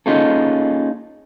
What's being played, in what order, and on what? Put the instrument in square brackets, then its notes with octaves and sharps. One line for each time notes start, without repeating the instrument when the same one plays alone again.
[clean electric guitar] A#3 C#4 D#4 F4 G#4 A4